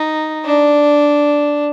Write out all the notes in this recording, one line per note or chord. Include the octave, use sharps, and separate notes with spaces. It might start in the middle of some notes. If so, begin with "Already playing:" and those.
Already playing: D#4
D4